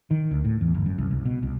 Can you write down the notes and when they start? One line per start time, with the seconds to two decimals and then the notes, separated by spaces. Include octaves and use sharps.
0.11 D#3
0.31 D2
0.45 A2
0.61 E2
0.74 G1
0.86 F#2
0.98 C2
1.11 C2
1.25 B2
1.43 C2